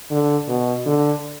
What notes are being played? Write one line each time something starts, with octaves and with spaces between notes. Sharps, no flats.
D3
B2
D3